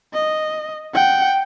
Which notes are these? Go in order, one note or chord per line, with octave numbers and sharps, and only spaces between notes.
D#5
F#5 G5